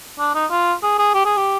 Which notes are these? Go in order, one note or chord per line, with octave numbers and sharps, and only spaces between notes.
D4
D#4
F4
G#4
G#4
G4
G#4
G4